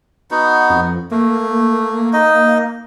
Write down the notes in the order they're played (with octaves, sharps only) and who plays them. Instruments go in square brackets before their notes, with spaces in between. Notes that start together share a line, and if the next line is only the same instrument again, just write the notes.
[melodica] B3 D#4 F#4
[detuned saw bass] F2
[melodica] A3 [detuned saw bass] A#3
[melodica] D#4 D#5